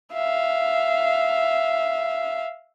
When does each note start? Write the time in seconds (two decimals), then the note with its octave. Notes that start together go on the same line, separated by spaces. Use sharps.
0.13 E5 F5